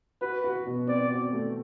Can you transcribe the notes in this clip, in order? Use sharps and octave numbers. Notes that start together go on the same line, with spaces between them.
F#4 B4
F#4
B2
C4 D5
F#4
A3